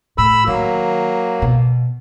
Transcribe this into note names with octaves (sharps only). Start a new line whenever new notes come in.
A2 B5 E6
D#3 F#3 A#3
B2